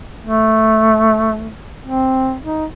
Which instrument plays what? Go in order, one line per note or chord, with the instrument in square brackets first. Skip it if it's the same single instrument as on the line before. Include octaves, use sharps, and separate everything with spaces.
[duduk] A3
C4
D#4